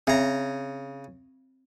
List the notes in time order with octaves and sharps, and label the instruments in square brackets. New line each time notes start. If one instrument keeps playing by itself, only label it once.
[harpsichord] C#3 A#5 [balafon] C4 E5